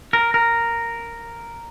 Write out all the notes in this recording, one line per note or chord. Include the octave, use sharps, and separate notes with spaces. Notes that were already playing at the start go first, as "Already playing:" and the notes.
A#4
A#4